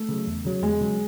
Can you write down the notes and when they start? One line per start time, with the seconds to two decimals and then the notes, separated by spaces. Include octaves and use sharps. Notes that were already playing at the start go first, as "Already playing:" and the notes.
Already playing: A3
0.09 C#3 F#3
0.27 E2
0.45 C#3 F#3
0.63 E2 G#3
0.81 C#3 F#3